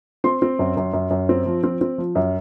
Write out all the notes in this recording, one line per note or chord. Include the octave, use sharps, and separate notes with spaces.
C4 C6
C4
F#2
F#2
F#2
F#2
C4
F3
C4
C4
F3
F#2